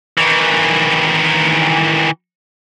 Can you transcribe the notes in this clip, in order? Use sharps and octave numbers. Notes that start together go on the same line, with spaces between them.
D#3 E3